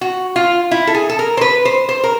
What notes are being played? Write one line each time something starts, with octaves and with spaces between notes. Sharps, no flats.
F#4
F4
E4
A4
G#4
A4
A#4
C5
B4
C5
C5
A#4